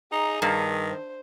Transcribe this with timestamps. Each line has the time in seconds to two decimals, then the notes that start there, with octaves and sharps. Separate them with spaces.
0.12 D#4 G#4 A#5
0.42 G2 D#3
0.88 C5